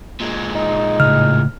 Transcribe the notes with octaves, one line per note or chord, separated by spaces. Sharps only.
A#2 G#3
D#4
A2 C#3 F6